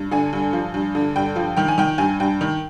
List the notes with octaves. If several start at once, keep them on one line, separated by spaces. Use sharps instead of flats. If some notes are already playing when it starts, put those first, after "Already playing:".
Already playing: G2
D3 G#5
G2
F3
G2
D3
G2 G5
F3
D#3 G5
G#5
D#3 G5
G2 G#5
G2 G5
D#3